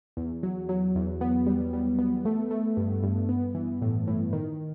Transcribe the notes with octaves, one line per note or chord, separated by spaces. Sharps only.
E2
F#3
F#3
E2
B3
G3
G3
B3
A3
A3
G2
G2
B3
E3
A2
A2
D#3